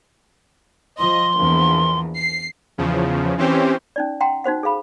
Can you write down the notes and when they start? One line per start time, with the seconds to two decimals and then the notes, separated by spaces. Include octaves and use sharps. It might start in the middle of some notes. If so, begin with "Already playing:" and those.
0.98 F3 D#5 C6
1.39 A#1 E2
2.18 C7
2.78 E2 C#3 F3
3.37 E3 C4 C#4 G4 C5
3.96 C#4 D#4 D5
4.21 F#5 G5 A#5 C6
4.44 D#4 F#4 C5 F#5
4.63 G#4 A4 F5 B5